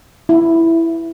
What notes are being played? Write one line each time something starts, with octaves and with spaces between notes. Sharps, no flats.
E4